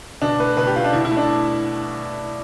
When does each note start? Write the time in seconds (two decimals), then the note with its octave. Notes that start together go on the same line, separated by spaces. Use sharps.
0.22 B2 D4
0.39 A3 B4
0.57 B2 B4
0.67 G4
0.76 A3 F4
0.85 D4
0.93 B2 E4
1.05 E4
1.11 A3
1.17 D4